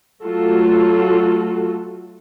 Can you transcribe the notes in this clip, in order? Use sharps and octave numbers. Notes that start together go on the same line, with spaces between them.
F#3 A3 F4 F#4 A4